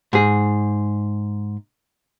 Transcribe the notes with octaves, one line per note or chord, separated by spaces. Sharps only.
G#2 G#4